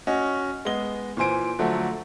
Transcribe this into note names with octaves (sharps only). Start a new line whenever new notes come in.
C#4 F#4 D#5
G#3 B3 D#5 G7
A#2 E3 C5 G#5 D7
D3 F3 F#3 A3